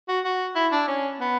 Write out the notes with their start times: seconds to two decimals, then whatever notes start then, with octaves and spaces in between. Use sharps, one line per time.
0.08 F#4
0.25 F#4
0.55 E4
0.72 D4
0.88 C#4
1.20 B3